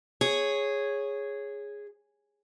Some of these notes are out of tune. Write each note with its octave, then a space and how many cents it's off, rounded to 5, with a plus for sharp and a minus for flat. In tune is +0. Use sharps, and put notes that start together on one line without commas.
G#4 -5 C#5 -5